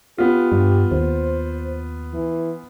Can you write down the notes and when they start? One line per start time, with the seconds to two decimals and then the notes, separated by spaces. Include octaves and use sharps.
0.18 B3 F4 G4
0.52 G2
0.92 D#2 C5
2.14 E3